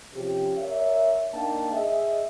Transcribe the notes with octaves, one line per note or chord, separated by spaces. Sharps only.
C3 F3 C#4 G4
A#4 C#5 D5 E5
A#3 D4 D#4 D5 G5 A5
G#4 D#5 E5